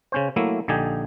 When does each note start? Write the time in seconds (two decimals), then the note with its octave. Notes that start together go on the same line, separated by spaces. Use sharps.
0.12 C#3 C#4 C5
0.36 F#3 A3 A#3 E4
0.68 A#1 D3 D#4 G4 G#5